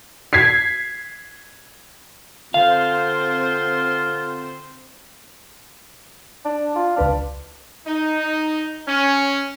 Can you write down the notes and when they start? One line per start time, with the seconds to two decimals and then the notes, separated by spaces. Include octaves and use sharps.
0.33 G#6 B6 C7
2.54 D3 C4 F4 C5 F5
6.45 D4
6.76 F4
6.96 C#2 D4 B4 F5
7.86 D#4
8.87 C#4